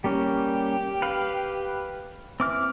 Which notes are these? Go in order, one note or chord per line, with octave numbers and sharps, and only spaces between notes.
G3 A#3 C#4 G4
B4 F5
E3 C4 D6 F6